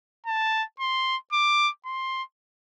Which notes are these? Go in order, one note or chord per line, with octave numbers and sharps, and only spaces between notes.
A5
C6
D6
C6